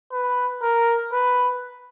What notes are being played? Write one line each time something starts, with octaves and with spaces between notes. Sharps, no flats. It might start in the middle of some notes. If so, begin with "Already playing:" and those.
B4
A#4
B4